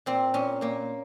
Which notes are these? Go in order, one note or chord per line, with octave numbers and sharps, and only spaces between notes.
A#2 C4
A#2 C#4
A#2 A#3